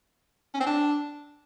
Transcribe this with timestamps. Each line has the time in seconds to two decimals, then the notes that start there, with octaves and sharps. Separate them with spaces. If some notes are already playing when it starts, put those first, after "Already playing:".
0.54 C#4
0.60 C4
0.66 D4